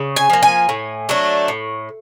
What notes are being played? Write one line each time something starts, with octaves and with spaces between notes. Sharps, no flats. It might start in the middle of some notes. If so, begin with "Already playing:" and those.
Already playing: C#3
G#5
F3 A#3
G#5
A2
F#3 A3 D4
A2